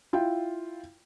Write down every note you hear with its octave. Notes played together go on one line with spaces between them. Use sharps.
E4 F4 G5